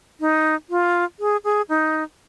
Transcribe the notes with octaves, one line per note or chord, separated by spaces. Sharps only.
D#4
F4
G#4
G#4
D#4